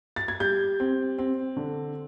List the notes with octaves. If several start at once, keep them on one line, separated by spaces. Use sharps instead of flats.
A6
G#6
G3 G6
C4
C4
D3